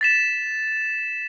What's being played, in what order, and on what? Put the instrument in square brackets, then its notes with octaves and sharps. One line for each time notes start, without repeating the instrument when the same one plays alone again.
[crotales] A6 B6 E7